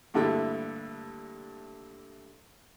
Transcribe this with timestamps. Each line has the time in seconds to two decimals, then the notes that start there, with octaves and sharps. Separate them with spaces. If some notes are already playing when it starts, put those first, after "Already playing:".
0.14 G2 A#2 D3 G3 A3 E4